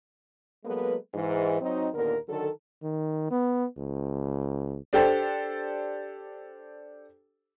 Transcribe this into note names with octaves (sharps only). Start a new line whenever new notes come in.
F#3 G#3 A#3 B3 A4 B4
G#2 E3
F#3 C4 D#4
D#2 A#2 D3 B3 A#4
D3 D#3 F#3 A4
D#3
B3
C#2
D4 G4 A4 C5